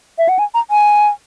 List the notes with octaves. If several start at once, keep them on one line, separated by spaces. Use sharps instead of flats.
E5
F#5
G#5
A#5
G#5